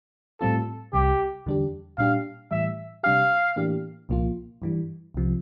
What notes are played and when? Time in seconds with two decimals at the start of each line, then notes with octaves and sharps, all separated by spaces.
0.40 A2 G3 C4 F4 A4
0.93 C2 C3 G3 G4
1.46 E2 D3 G3 D4 G4
1.98 A#2 G3 D4 G4 F5
2.51 A2 E3 G3 E5
3.03 C3 G3 D4 G4 F5
3.56 A2 E3 A#3 D4 G4
4.09 C2 A#2 F3 A#3 F4
4.62 G2 E3 G3
5.14 C2 C3 F3